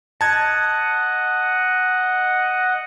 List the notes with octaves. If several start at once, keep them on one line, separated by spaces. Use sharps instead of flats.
D#5 F#5 A5 G#6